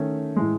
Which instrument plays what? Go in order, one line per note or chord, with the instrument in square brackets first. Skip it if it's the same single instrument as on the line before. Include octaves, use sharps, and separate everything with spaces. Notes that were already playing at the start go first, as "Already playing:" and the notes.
Already playing: [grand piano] D#3 A3 C#4
A2 E3 G#3